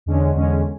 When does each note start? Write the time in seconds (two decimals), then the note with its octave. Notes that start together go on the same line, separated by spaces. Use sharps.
0.06 E2 D3 G#3 C#4
0.35 E2 D3 G#3 C#4